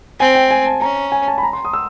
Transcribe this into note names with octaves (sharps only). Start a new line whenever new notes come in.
C4 G#5
G5
G#5
A5
C#4 A#5
G#5
A5
B5
A#5
C6
D#6
E6